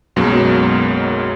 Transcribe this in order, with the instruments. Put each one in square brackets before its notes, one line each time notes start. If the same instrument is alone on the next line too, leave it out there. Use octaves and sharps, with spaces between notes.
[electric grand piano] B1 F#2 B2 F#3 G#3 A#3